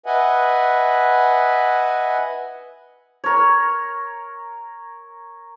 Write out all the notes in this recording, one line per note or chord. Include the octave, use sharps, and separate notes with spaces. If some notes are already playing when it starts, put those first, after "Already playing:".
B4 D#5 E5 F#5 G#5
A#4 C#5